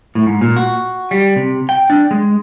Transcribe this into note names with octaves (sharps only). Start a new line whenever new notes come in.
A2
G#2
A#2
F#4
G3
C3
G5
D4
G#3